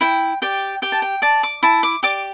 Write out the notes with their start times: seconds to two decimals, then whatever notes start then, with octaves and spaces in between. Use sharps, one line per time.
0.01 E4 G5
0.42 G4 D5 G5
0.82 G4 G5
0.92 A5
1.02 G5
1.22 D5 A5
1.43 D6
1.63 E4 A5
1.83 D6
2.03 G4 D5 D6